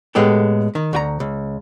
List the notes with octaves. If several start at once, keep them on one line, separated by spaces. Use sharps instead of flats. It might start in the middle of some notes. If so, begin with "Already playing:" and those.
A2 G#3 B3 G4 A4
D#3
D2 F#4 A#5
C#2